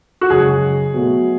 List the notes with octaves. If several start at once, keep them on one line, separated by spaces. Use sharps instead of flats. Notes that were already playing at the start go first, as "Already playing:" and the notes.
F#4
F#2 C#3 G#3 G#4
B2 F#3 A3